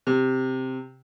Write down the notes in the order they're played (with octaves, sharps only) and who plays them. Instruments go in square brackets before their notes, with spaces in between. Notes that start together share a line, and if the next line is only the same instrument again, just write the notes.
[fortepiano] C3